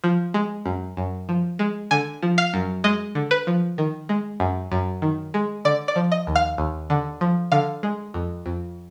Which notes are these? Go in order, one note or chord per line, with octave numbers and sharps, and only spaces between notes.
F3
G#3
F#2
F#2
F3
G#3
D3 G#5
F3
F5
F#2
G#3 D#5
D3
B4
F3
D#3
G#3
F#2
F#2
D#3
G#3
D3 D5
D5
F3
D#5
D#2
F5
D#2
D3
F3
D3 F5
G#3
F2
F2